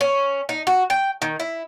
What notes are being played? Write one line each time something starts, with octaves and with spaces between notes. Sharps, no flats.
C#4
D#4
F#4
G5
D#3
E4